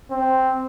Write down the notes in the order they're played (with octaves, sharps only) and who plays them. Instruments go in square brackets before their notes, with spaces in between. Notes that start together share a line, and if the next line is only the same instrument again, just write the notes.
[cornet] C4